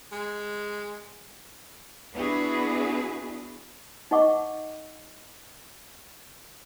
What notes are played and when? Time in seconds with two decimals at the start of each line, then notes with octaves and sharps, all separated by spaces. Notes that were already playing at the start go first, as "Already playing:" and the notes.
0.12 G#3
2.13 B3 D4 E4 F#4 G#4 B4
4.11 D#4 C5 D#5 F#5 C#6 D6